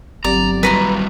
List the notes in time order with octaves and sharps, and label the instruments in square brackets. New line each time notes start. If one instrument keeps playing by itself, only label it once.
[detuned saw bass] G1 [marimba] F#3 C4 G4 [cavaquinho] D5 [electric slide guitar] A#5
[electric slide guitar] G3 E4 F#4 [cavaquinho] B4 A#5 C6